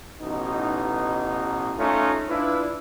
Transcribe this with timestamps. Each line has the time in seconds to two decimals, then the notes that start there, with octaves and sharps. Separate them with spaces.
0.21 A1 B2 D#4
1.77 A3 C#4 D#4 F4
2.28 D4 E4 F4 B4